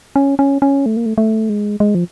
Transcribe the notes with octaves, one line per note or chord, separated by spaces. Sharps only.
C#4
C#4
C#4
A3
A#3
A3
A3
G#3
G#3
F3